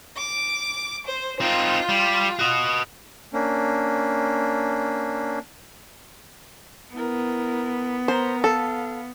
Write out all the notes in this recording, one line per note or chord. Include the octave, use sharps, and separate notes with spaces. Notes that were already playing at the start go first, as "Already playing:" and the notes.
D6
C5
C4 D#4 F4
G3
F#4 D#5
A#3 C#4 D4
B3 E4 A#4
A#4 C5 A#5
A4 F5